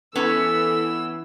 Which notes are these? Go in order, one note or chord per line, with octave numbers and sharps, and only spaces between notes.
E3 B3 C#4 A4 B4 E6